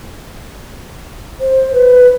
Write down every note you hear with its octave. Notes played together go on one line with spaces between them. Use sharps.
C5
B4